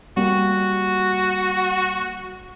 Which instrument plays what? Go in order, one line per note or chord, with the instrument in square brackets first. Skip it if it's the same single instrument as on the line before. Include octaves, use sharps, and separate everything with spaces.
[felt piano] G3 A#3 [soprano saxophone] F#4